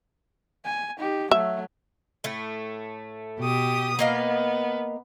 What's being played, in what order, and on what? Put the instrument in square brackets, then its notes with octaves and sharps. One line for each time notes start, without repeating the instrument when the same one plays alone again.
[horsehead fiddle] G#5
D#4 G4
[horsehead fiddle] F#3 A3 [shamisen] E5
[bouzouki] A2 A3
[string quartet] B2 G4 D#6
[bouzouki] A#3 D#5 F5 [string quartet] B3